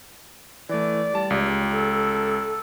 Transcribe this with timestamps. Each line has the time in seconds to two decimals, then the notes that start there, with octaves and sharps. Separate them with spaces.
0.69 E3 A3 D5
1.14 G3 A5
1.30 C#2 G4
1.72 A4